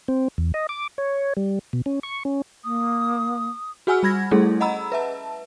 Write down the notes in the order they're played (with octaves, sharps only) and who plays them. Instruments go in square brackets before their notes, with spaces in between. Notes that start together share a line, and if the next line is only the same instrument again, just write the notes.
[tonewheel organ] C4
E2
D#5
D6
C#5
G3
B2
C#4
C#6
C#4
[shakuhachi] A#3 [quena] D#6
[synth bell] F#4 G#4 F#5 G#5 E6 F6
G3 B5 G#6 A#6
G3 A3 C#4 E4 G#4 A4
D#5 F#5 A#5 B5 E6
B4 E5 A5